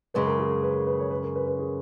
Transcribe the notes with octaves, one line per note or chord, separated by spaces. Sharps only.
F#2 C#3 G#3 B4
A#4
G#4
A#4
B4
B4
C#5
B4
A#4
B4
B4
G#4